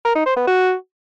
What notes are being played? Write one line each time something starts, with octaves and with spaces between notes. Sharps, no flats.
A#4
D#4
C5
B3
F#4